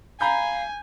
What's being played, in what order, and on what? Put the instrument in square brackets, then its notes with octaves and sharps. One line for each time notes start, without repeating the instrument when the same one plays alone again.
[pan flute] F5 [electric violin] G#5 [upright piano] A#5 B5 G6